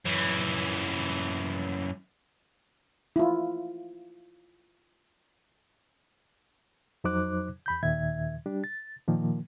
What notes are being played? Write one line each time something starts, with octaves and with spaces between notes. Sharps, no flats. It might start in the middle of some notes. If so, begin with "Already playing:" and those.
F#2 E3
E4 F4
F2 F#3 D#4 C5 D6 F#6
E2 B5 G6
D#2 A#2 D#3 E5 G#6
G3 D4 G4
A6
A#2 D#3 F3 A#3